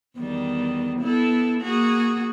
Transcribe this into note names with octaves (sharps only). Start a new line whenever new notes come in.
E2 D#3 G3
B3 E4 A4
A#3 F#4 G#4